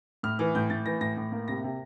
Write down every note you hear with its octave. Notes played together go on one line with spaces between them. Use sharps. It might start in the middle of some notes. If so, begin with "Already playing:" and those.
A2 F6
E3 F6
A2 G6
A2 A6
E3 A#6
A2 A#6
A2
A#3
C3 A#6
C3